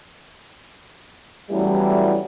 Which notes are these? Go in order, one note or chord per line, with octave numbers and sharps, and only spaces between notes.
A1 E2 A2 E3 F#3 G3